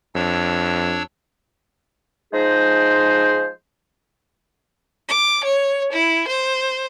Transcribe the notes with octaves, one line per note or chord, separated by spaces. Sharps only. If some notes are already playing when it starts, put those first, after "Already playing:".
F2 D4 C#5 E6
F3 G#3 D#4 G#4 C5
D6
C#5
E4
C5